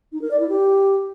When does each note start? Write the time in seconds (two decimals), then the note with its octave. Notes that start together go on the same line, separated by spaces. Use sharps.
0.12 D#4
0.22 A#4
0.31 D5
0.40 E4
0.49 G4